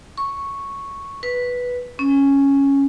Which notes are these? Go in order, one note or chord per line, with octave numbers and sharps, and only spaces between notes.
C#6
B4
C#4